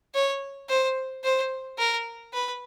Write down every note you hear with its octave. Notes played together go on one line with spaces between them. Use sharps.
C#5
C5
C5
A#4
B4